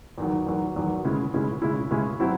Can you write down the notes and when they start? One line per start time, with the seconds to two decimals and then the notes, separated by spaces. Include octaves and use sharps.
0.18 E2 D#3 F#3
0.46 E2 D#3 F#3
0.76 E2 D#3 F#3
1.04 C#3 G#3 C#4 E4
1.34 C#3 G#3 C#4 E4
1.62 C#3 G#3 C#4 E4
1.91 C#3 G#3 C#4 E4
2.20 F#3 C4 E4